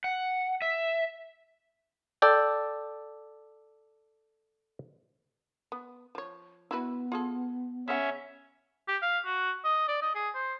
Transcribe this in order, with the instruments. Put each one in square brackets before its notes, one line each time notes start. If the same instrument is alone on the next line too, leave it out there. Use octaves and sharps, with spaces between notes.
[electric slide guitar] F#5
E5
[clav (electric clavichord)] A4 D5 G5
[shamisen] B3
F3 C#5
[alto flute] B3 [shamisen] E4 F#4 B4
[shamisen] F4 G#4 A4
[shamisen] C#3 F#5 [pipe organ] C#4 E5
[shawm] G4
F5
F#4
D#5
D5
D#5
G#4
C5